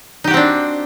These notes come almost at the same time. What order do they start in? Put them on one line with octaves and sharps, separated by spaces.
D#4 G4 F#4 C4 D4